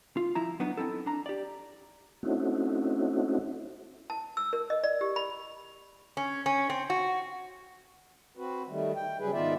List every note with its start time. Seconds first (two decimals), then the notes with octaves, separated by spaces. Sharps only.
0.17 F4
0.35 F3 E4 A#5
0.60 F#3 B3 D4 D#4
0.77 C4 D#4 E4 A4
1.06 D4 A#5
1.26 G4 D5
2.23 A3 C4 C#4 D#4 E4 F#4
4.10 A5
4.37 E6
4.53 A#4
4.70 D#5
4.84 D5
5.01 G4
5.16 B5
6.17 C#4
6.46 C#4
6.70 C4
6.90 F#4
8.37 C4 F#4 B4
8.68 D#3 G3 A3
8.96 G5
9.19 C#3 F#3 G3 G#4 B4
9.32 G#2 D#3 B3 F4 D5 E5